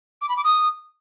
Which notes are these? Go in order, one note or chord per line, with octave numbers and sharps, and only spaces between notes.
D6
B5
D6
D#6